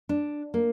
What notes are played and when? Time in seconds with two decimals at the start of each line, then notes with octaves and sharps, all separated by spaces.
0.09 D4
0.54 A#3